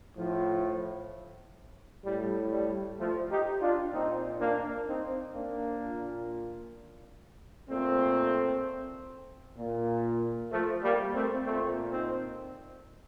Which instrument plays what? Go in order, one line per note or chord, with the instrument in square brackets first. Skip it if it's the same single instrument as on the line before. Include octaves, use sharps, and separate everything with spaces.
[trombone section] A2 F3
A2 G3
G3
F3 A3
D#4 G4
D4 F4
A#2 C4 D#4
A#3 D4
C4 D#4
A#3 D4
A#2
A#2 A3 C4
A#2
F3 A3
G3 A#3
A3 C4
A#2 A3 C4
C4 D#4